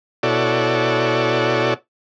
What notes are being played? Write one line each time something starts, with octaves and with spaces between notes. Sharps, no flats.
B2 E4 F#4 A4 C#5 D5